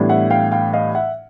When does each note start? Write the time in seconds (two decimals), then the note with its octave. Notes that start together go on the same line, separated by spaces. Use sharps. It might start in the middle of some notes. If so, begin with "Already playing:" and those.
Already playing: A2 E3 G3 B3 D4
0.09 E5 F#5
0.30 F5 G5
0.52 F5 G5
0.73 D#5 F5
0.95 E5 F#5